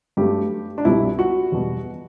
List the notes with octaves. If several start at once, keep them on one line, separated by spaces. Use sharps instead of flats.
G2 F#3 A3 G4
D4
C2 B2 G3 E4
F#4
E2 B2 G3